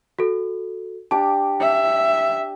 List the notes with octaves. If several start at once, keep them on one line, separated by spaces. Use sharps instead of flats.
F#4 A4
D4 G4 A5 D6
E5